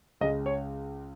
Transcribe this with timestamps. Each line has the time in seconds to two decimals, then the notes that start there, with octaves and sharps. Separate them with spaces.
0.21 C#2 C#3 G#3 D#5
0.46 C#5